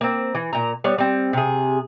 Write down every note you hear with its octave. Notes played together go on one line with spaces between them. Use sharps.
A#3 C4
E3
A#2 A#5
G3 B3 C#5
G3 C4
C3 G#4